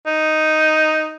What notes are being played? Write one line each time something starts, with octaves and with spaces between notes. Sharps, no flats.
D#4